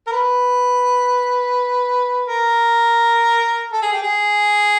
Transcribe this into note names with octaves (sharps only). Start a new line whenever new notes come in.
A#4
B4
A#4
A4
G#4
G4
G#4